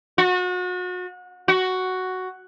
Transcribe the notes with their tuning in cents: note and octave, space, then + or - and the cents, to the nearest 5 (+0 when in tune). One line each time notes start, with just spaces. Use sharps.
F#4 -35
F#4 +5